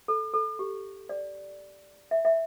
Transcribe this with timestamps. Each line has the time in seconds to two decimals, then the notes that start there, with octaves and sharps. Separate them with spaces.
0.08 A4
0.34 A4
0.59 G4
1.09 D5
2.11 E5
2.25 E5